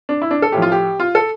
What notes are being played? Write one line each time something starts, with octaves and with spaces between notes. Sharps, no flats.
D4
E4
D4
A4
A2 F3 G4
F4
G4
F4
A4